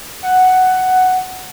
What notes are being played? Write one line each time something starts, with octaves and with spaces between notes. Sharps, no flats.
F#5